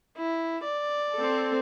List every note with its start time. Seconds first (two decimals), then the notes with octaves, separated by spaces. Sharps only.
0.18 E4
0.65 D5
1.15 C4 A4